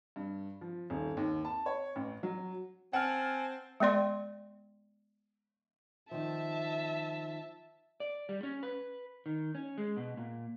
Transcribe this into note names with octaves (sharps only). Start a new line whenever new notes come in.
G2
F3
D#1
D#2
A5
C#5
A1
F#3
C4 F#5 G#5 A5 F6
G#3 B3 D5 C6
D#3 F3 E5 A5
D5
G3
C#4
B4
D#3
C#4
G#3
B2
A#2